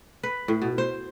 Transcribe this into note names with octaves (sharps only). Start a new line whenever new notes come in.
B4
A2
B2
C5